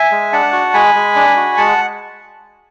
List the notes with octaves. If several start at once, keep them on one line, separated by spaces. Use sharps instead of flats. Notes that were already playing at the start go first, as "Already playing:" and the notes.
Already playing: E5 G#5
G#3
D4 F#5 A5
F#4
G#3 G#5 B5
G#3
D4
F#4
G#3 F#5 A5